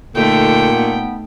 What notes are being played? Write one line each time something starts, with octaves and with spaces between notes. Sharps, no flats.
A#2 D3 A3 D#4 G5
B3